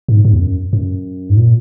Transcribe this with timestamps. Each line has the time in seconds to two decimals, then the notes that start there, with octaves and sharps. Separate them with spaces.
0.08 G#2
0.25 G#2
0.33 E2
0.40 F#2
0.73 F#2
1.30 G#2
1.37 A#2